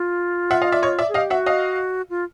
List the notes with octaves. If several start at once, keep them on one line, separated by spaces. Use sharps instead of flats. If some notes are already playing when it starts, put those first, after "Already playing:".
Already playing: F4
E5 F#5
D#5 F5
D5 E5
C#5 D#5
D5 E5
G#4
G4 D#5 F5
F#4 E5 F#5
D#5 F5
F4